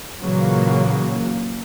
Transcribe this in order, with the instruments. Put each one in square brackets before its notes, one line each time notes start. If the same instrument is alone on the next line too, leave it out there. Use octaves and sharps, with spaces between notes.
[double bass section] A#2 C#3 E3 F#3 A#3